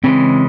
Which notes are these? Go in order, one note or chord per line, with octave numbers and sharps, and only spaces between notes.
C#3 E3 G#3 C4